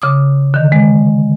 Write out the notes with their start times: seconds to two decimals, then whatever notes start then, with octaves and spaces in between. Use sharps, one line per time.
0.02 C#3 D6 D#6
0.54 D3 D#3
0.72 G#3